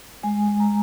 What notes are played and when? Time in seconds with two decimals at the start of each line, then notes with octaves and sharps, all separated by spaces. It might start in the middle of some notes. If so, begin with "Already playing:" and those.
0.23 G#3 G#5
0.48 G#3
0.60 A#5